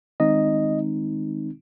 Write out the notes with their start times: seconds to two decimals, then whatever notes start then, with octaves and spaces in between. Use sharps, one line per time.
0.20 D#3 G#3 C4 D#4 D#5